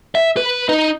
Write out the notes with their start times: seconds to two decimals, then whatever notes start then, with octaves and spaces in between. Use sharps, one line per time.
0.15 E5
0.37 B4
0.69 D#4